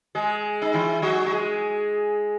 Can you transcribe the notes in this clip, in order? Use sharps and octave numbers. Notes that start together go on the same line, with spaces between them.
G#3 G#4
D#4
E3 E4
F#3 F#4
F#4
G#3 G#4